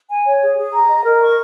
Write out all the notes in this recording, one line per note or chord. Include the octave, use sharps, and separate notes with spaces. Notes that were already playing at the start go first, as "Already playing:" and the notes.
G#5
C#5
G#4
G#4
A#5
D#5
A#4
C#6